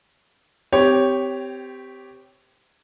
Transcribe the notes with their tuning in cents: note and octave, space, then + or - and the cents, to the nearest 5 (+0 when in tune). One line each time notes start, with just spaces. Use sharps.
C4 -25 G4 +0 C#5 +0